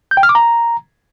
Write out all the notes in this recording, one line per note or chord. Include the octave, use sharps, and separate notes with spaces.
G6
G5
F6
D6
A#5